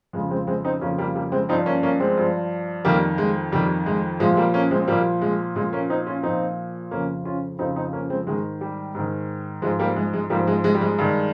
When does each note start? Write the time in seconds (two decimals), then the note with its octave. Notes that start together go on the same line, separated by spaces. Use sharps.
0.13 F2 C#3 F3 G#3
0.31 G#3 C4
0.47 G#3 C4
0.65 C4 D#4
0.81 F2 C#3 F3 A#3 C#4
0.98 G3 A#3
1.15 G3 A#3
1.32 G#3 C4
1.49 G2 F3 C4 D#4
1.66 A#3 C#4
1.83 A#3 C#4
2.00 G#3 C4
2.17 G2 F3
2.85 F2 D#3 G3 A#3
3.18 G#3
3.52 F2 D#3 G3
3.86 G#3
4.20 A#2 F3 G#3
4.33 G#3
4.37 G3 A#3
4.54 A#3 C#4
4.71 G#3 C4
4.82 C4
4.88 A#2 F3 G3 A#3
5.22 G#3
5.56 A#2 G#3
5.59 F3
5.73 A#3 C#4
5.89 C4 D#4
6.07 C#4 F4
6.23 A#2 F3 C4 D#4
6.91 F2 C#3 F3 A#3 C#4
7.25 C#4 F4
7.59 F2 C#3 F3 C4 D#4
7.76 C4 D#4
7.93 A#3 C#4
8.10 G#3 C4
8.27 G#2 D#3 G#3
8.61 G3
8.95 G#2 D#3
9.62 G#2 F3 G#3
9.79 G3 A#3
9.96 G#3
10.14 G#3
10.30 G#2 F3 G3 A#3
10.47 G#3
10.64 G#3
10.75 G3
10.81 G#3
10.98 G2 D#3